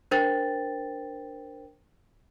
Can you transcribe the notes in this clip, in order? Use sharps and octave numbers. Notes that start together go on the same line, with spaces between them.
D4 A#4 C5 G5 A6